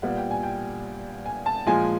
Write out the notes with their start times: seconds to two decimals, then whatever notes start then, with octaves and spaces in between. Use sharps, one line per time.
0.02 A#2 G3 B3 F#5
0.17 G5
0.31 G#5
0.43 G5
1.26 G#5
1.46 A5
1.66 A#2 F3 G#3 G#5